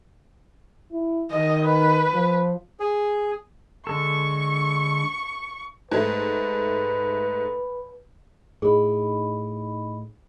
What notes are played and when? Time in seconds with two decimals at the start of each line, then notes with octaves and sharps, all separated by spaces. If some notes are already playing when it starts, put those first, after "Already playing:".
0.92 E4
1.31 D#3 D#5
1.66 B4
2.13 F3
2.80 G#4
3.87 D3 G#3 A4 C#6
5.91 G#2 A3 B4
8.62 A2 D#4 G#4 D#5 B5